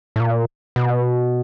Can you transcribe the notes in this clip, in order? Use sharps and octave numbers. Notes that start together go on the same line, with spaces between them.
A2
A#2
B2